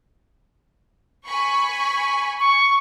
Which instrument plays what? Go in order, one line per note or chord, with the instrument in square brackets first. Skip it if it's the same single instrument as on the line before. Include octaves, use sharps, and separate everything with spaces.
[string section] G#5 B5 C#6
[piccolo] C#6